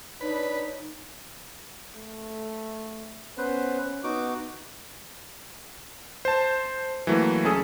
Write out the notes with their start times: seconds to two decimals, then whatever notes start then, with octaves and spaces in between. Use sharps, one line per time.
0.21 D4 D#4 B4 C#5
1.96 A3
3.38 B3 C#4 B4 C5
4.04 B3 D#4 F#4 D6
6.25 C5 A5
7.07 E3 F#3 A3 A#3
7.44 C#2 C#4 G#4 A4 D#6